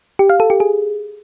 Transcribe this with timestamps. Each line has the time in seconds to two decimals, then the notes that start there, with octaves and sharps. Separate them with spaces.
0.19 G4
0.30 F5
0.40 A4
0.50 G4
0.60 G#4